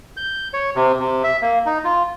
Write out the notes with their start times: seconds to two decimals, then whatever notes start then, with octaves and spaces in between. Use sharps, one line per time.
0.17 G6
0.53 C#5
0.76 C3
0.99 C3
1.24 E5
1.42 A#3
1.66 D#4
1.84 F4